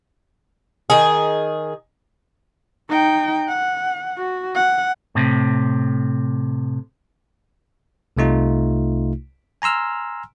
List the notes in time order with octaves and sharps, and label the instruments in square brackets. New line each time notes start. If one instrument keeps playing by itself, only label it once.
[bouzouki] D#3 G#4
[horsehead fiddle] D#4 G5
F#5
F#4
F#5
[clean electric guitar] A2 C3
[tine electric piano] C2 C3 A3 D#4 F4
G#5 A#5 C6 E6 F6